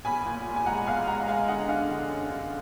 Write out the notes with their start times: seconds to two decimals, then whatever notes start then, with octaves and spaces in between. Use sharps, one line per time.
0.05 B1 G#5 B5
0.26 A#2
0.47 A#2
0.56 G#5
0.66 G#3 F#5 A#5
0.86 B1 F5 G#5
1.07 G#3 F#5 A#5
1.28 G#3 F5 G#5
1.48 D3 D#5 F#5
1.68 D4 F5 G#5
1.89 D3
2.09 F#2
2.30 D4